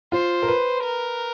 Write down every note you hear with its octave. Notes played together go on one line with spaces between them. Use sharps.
F4 C5
A#4
B4
A#4